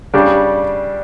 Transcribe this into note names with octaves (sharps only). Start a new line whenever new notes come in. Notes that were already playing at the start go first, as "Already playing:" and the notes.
C#3 G3 D4 G4